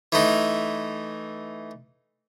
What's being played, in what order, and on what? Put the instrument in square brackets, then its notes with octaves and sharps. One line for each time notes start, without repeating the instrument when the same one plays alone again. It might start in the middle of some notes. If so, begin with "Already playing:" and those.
[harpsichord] E3 A3 D#4